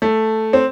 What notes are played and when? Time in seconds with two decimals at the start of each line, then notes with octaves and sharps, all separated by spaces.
0.02 A3
0.53 C4